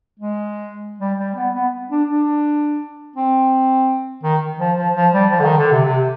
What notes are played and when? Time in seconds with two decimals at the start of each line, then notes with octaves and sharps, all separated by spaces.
0.20 G#3
1.00 G3
1.19 G3
1.36 B3
1.54 B3
1.90 D4
2.08 D4
3.16 C4
4.23 D#3
4.59 F3
4.77 F3
4.95 F3
5.13 G3
5.31 F3
5.40 D3
5.44 D#3
5.58 D3
5.72 C3
5.85 C3